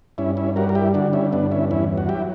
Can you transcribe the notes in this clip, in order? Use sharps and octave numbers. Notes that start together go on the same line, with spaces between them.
G2 C#4 E4
C#4 E4
G3 F#4 A#4
A#4
E4 G4
D3 D4 F#4
C#4 E4
G2 B3 D4
C#4 E4
E2 C#4 E4
F#4
F#3 E4 G4